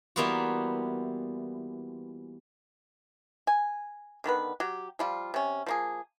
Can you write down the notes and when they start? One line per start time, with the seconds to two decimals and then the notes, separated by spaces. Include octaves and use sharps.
0.16 E3 G3 A#3 B3 F4 F#4
3.47 G#5
4.24 D3 D#3 B3 B4
4.60 F#3 G4
4.99 F3 G3 F4
5.34 C3 C#4
5.66 F3 A#3 G#4